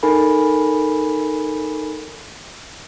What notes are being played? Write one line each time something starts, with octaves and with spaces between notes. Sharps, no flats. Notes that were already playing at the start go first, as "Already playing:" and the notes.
D#4 A4 A#4 G#5 B5